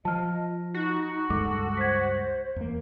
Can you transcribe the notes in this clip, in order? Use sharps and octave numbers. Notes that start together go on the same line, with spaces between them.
F3 D#5 A5 F6
D#4 F#4
C#2 G2 G#3 A4 D6
C5 G#6 B6
E2 A#3